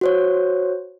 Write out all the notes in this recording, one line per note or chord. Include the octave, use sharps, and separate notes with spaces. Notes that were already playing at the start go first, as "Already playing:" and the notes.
F#4 C5 C#5